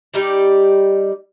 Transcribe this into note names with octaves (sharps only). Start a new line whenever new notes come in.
G3 D#4 G4 D5